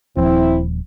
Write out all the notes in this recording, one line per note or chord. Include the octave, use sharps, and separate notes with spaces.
D#1 F3 C4 E4